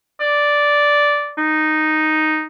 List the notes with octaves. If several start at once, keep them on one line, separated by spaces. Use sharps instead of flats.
D5
D#4